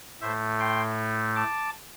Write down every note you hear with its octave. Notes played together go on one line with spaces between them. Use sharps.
A2 A3 C5 E5
G5 C6
A5 D6